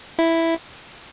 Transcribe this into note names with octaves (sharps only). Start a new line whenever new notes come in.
E4